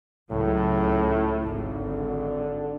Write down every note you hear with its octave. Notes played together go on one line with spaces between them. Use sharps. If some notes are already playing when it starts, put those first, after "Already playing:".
C#2 A2 F#3
G#1
D3